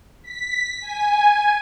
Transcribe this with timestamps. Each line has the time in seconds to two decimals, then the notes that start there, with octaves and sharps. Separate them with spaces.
0.23 B6
0.80 G#5